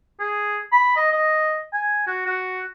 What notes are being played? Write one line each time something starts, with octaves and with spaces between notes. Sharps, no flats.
G#4
B5
D#5
D#5
G#5
F#4
F#4